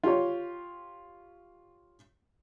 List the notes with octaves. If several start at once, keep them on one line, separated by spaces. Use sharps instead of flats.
F4 G4 C#5